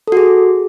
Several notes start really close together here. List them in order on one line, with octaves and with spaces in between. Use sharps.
A4 F#4 G#4